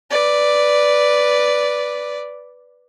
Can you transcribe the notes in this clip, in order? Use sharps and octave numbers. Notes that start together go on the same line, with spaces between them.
B4 D5